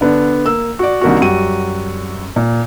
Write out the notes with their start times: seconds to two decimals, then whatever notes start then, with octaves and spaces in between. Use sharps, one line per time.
0.01 D3 B3 D4
0.46 A#3 E6
0.79 F#4 D5
1.01 C2 D#3 A#3 D4 F#4
1.20 F#2 G3 F#4 D#7
2.36 A#2